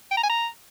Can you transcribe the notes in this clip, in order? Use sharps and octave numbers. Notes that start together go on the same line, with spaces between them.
G5
A#5
G#5
A#5